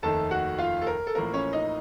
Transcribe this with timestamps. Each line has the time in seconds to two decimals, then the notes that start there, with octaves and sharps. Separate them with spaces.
0.02 F1 D#2 D#3 A3 A4 A5
0.31 F#4 F#5
0.58 F4 F5
0.82 A4
0.87 A#4
1.07 A4
1.15 A1 A2 F3 A#3 A#4
1.34 C#4 C#5
1.53 D#4 D#5